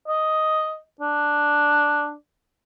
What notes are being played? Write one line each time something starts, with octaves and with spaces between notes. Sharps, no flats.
D#5
D4